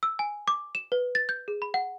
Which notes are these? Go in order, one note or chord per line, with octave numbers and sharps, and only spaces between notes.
E6
G#5
D6
E7
B4
A6
G6
G#4
B5
F#5